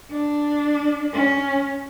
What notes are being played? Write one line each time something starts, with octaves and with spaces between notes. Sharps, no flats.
D4
C#4